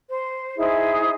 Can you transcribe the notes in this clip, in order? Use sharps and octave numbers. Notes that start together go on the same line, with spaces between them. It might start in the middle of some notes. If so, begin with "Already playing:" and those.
C5
D#4 E4 G#4 C5